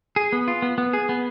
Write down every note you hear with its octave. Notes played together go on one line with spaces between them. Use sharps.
G#4
B3
F4
B3
B3
G#4
B3